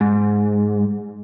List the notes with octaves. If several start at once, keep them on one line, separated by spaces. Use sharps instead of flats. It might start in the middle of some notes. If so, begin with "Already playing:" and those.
G#2